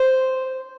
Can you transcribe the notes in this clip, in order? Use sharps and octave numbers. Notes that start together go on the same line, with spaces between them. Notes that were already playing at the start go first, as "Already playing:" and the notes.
Already playing: C5